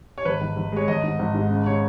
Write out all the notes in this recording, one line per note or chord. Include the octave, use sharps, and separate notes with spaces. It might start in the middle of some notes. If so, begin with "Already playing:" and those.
C#5
G#1 B4
G#1
G#1
G#3 C#5
G#1 D#5
G#2
G#1
G#2
C#3
C#3 C#5